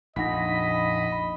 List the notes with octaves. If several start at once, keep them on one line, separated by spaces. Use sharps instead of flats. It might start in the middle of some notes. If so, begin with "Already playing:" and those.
A#1 F2 D#4 D#5 F#5 B5 A#6